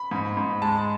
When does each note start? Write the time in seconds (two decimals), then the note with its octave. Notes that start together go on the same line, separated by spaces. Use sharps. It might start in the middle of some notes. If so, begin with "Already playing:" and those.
Already playing: B5
0.11 G#2
0.37 G#2
0.62 G#3 A5